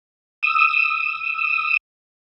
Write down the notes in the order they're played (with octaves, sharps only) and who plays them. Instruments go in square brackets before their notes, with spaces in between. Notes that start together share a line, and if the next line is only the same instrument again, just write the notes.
[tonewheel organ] D#6 E6